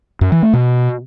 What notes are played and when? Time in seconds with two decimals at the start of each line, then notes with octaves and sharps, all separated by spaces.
0.21 F#2
0.32 E3
0.43 A3
0.53 B2